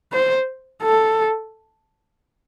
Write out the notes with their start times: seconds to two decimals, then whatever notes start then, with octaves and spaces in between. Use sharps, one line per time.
0.13 C5
0.83 A4